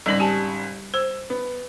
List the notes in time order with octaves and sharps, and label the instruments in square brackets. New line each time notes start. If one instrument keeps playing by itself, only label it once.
[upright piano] G#1 C#3 F#7 [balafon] G3 D#4 D5
[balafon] G4 G#5 A5
[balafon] C5 [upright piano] E6
[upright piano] B3